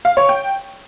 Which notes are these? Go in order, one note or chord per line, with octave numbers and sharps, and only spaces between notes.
F5
C#5
G5